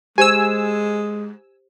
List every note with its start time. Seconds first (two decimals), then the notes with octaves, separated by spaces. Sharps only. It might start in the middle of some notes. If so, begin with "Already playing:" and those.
0.18 G#3 G4 C5 G#5 E6